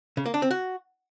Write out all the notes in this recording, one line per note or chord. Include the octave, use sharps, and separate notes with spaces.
C#3
A#3
D4
C4
F#4